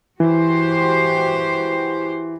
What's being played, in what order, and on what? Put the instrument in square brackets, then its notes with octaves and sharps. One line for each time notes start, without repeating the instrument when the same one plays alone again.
[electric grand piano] E3 [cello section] F#4 G4 C5